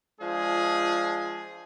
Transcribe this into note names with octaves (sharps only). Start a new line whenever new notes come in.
F3 G#3 D4 F4 G#4